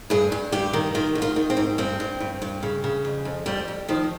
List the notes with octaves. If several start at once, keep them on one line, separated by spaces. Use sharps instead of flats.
G2 G#4
G2
G2 G4
D#3
D#3 F4
G#2
F4
D#3
C4
G#2
G2 C4
G2
G2
G2
C#3
C#3
F2
F2
F2 G3
F2
D#3 F3